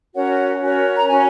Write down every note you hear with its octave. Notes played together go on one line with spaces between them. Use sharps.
C#4 F#4 A#4 C#5 F#5
C#4 F#4 A#4 C#5
A#5
C#4 F#4 C#5 G#5